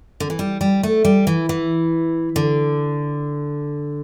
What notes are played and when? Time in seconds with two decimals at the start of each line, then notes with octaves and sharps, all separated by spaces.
0.20 D3
0.30 E3
0.39 G3
0.61 G3
0.83 A3
1.05 G3
1.27 E3
1.49 E3
2.36 D3